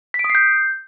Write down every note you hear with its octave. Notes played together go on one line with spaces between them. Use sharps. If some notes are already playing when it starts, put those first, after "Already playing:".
B6
D7
D#6
C7
G6